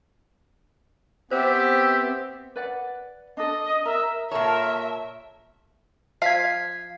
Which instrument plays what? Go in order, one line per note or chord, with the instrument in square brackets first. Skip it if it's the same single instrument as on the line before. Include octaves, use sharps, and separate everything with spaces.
[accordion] B3 C4 [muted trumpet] G4 [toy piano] C5 [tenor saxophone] E5
[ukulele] B4 D5 F#5
[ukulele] D4 A4 [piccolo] D#5
[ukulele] A#4 [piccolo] E5
[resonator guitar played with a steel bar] A#2 A4 C#5 [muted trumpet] A#4 [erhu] E5 [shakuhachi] A5
[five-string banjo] F3 F4 F5 [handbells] G#6 B6 C7